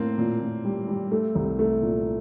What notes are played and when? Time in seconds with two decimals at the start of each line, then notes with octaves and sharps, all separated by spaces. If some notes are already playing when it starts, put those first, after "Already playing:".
Already playing: A2 A#3 C4
0.18 A#2
0.41 A#2
0.64 G3
0.88 G3
1.12 A3
1.35 C2
1.59 A3
1.82 A#2